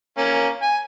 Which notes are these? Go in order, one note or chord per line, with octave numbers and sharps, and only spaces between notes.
A#3 C#4
G#5